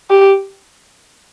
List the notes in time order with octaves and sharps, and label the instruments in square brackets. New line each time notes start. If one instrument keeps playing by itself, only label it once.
[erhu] G4